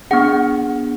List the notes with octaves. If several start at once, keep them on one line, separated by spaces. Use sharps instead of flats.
B3 D4 G#4 F#5